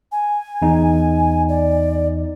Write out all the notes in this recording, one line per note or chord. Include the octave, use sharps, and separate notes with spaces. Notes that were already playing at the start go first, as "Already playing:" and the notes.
G#5
E2 D#4
D5